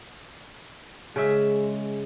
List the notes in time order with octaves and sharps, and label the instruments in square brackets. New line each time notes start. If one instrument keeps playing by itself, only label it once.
[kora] C#3 E5 [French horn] G#3